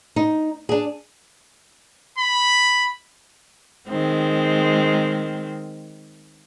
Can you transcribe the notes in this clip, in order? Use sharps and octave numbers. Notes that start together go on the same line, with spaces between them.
D#4
D4 G#4
B5
D#3 G#3 C4